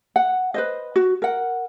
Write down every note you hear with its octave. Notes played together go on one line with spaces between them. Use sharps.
F#5
B4 C5 D#5
F#4
A#4 F#5